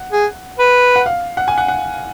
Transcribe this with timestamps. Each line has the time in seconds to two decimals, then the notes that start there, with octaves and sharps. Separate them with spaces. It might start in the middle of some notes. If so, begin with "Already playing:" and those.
Already playing: F#5
0.12 G#4
0.59 B4
0.96 F#5
1.06 F5
1.37 F#5
1.48 G#5
1.58 F#5
1.68 F#5